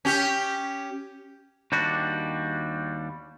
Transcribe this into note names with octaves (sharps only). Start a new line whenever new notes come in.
C#4 G4
D#2 G3 D4 F#4